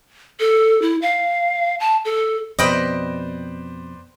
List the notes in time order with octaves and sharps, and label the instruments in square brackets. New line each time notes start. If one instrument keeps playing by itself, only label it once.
[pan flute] A4
E4
F5
A5
A4
[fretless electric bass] F2 B2 [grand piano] B4 C5 D5 [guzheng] D#5 G5 B5